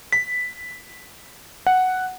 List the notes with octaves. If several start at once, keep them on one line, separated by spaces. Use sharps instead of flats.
B6
F#5